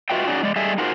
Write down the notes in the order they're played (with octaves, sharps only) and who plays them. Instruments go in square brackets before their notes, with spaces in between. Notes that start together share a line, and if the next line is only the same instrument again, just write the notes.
[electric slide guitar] F4 F#4 B4 D#5 E5 G5
C#4 D#4 F#4 G#4 D5
G#3 D5
G3 A3 G#4 D#5 E5
D#4 F4 F#4 G#4 A#4 C5